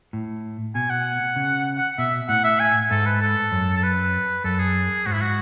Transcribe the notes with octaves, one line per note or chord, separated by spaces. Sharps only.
A2
B2 G#5
F#5
C#3
F#5
B2 E5
A2 F#5
E5
G#5
G#2 A4
B4
A4
F#2
A4
B4
F#2 A4
G#4
G#2 F#4
E4
F#4